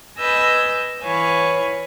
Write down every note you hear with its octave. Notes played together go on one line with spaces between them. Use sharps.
B4 D#5 G#5 E6 G6 A#6
E3 B4 C#5 F5 G#5